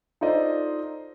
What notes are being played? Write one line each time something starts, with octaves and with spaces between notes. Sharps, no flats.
D#4 F4 A4 C5 D5 D#5